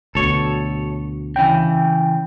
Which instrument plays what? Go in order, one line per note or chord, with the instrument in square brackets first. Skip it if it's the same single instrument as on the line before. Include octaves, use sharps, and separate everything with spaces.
[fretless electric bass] D2 B2 [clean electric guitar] A4 C#5
[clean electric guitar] C#3 E3 [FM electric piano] G5